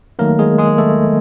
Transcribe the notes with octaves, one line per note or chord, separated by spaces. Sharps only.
D#3 F#3 A3 A#3 A#4
G#3 G#4
G#3 G#4
A3 A4